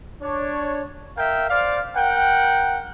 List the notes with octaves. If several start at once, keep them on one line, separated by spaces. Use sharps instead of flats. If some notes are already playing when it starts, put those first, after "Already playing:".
D4 C#5
A#4 E5 F5 G5
C5 D5 F5
A#4 F#5 G5